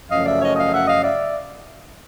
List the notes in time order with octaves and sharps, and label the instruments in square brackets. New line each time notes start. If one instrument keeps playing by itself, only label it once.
[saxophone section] F#2 C#3 F3 A3 C#4 D#5 F5
D5 E5
C#5 D#5
D#5 F5
E5 F#5
D#5 F5
D5 E5